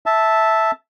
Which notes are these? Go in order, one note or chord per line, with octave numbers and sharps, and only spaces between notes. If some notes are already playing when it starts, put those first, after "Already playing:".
E5 A5